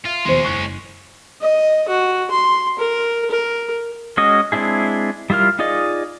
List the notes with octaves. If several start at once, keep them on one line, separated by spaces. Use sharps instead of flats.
F4 E5 F6
D#2 B2 F3 G#3 C#4 C5 C6
F#1 C#6 F#6 G7
D#5
F#4
C6
A#4
A#4
G#3 C#4 F#4 D#5
G#3 C4 D4 E4 G#4
G3 E4 F4 A#4 F6
D#4 F4 G#4 D5 D#5